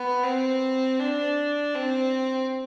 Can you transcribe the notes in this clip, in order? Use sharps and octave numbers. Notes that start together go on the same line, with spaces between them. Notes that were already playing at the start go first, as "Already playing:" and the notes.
Already playing: B3
C4
D4
C4